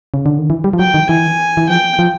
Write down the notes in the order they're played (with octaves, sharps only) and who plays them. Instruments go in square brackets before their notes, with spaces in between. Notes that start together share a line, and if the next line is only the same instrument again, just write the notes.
[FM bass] C#3
D3
D#3
E3
G3
F3
[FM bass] F#3 [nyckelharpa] G5
[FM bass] D#3
[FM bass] E3 [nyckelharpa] G#5
[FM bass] E3
[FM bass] F3 [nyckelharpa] G5
[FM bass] F3